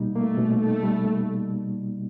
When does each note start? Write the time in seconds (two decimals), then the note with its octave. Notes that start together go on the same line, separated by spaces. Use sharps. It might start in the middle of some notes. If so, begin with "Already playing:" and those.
Already playing: B2 G3 A#3 D#4
0.15 A3 A#3
0.38 B2
0.61 A3 D#4
0.83 G3